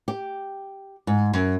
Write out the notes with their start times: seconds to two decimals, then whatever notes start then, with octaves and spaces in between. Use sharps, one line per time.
0.08 G4
1.07 G#2
1.33 F#2